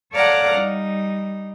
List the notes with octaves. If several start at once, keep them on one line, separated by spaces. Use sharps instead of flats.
A4 C#5 D5 F5 F#5 A#5
G3 D#4